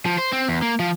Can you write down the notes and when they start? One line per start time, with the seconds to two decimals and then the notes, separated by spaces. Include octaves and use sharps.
0.05 F3
0.18 C5
0.32 C4
0.49 E2
0.62 A#3
0.80 F3